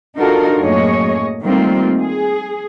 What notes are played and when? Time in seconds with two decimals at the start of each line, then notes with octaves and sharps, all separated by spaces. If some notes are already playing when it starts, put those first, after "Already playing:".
0.18 D4 D#4 F4 F#4 A4 A#4
0.61 F#2 A2 A#3 G#4 C#5 D#5
1.42 D#3 G3 A3 A#3 C4 F4
1.99 G#4